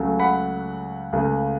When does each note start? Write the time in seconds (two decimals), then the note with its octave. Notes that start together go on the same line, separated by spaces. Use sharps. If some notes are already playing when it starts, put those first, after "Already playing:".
Already playing: C#2 C#3 F#3 A3
0.19 F#5 B5
1.13 C#2 C#3 A3